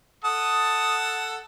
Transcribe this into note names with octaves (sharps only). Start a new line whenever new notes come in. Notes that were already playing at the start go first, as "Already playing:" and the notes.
A4 F#5 A5 D#6